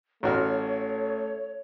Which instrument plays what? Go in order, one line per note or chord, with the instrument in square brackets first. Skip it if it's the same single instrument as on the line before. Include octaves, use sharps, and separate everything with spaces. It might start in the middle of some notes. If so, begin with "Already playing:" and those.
[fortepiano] A1 F#4 F6 [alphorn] A3 [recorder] C#5